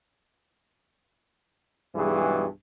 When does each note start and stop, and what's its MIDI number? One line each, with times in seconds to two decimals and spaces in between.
1.96 2.46 35
1.96 2.46 43
1.96 2.46 52
1.96 2.46 56
1.96 2.46 68